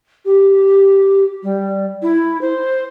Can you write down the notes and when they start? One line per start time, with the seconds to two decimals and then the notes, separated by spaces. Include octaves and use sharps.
0.26 G4
1.43 G3
2.02 E4
2.41 C5